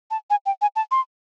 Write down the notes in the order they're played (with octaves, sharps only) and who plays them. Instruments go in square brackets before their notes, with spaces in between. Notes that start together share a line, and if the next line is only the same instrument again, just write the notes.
[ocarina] A5
G#5
G5
G#5
A5
C6